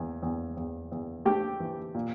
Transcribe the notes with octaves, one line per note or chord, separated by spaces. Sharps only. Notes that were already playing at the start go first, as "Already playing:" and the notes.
Already playing: E2
E2
E2
E2
A3 G4
E3
A#2